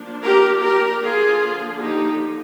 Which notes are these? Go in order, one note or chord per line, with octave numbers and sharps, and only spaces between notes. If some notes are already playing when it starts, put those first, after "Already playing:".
Already playing: F3 A#3 D4
G4 A#4
G4 A#4
D3 F3 A#3 F4 G#4
D#4 G4